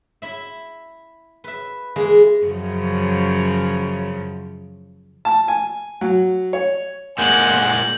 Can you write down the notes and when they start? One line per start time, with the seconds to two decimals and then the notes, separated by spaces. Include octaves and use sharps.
0.22 E4 E5
1.44 B4 E5
1.96 E3 G#3 A#3 G#4
2.46 F#2 C#3 F3
5.25 A5
5.48 G#5
6.01 F#3
6.53 C#5
7.18 A#2 G#3 A#3 F#5 G#5 C6 G6 F#7